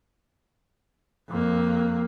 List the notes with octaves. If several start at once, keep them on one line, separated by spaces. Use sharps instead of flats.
F2 A#3